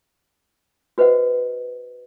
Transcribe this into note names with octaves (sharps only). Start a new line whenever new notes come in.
F#4 B4 C5 D#5 F#5